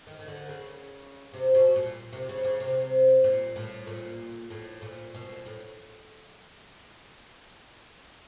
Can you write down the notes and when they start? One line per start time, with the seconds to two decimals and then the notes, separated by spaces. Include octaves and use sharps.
0.07 D#3
0.19 D#3
0.28 D3
0.49 C#3
1.34 C3
1.55 B2
1.76 A#2
2.13 C3
2.29 C#3
2.45 C#3
2.60 C3
3.24 A#2
3.56 A2
3.87 A#2
4.50 A2
4.82 A#2
5.14 B2
5.29 A#2
5.46 A2